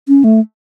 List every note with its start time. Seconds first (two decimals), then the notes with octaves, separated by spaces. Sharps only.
0.08 C#4
0.24 A3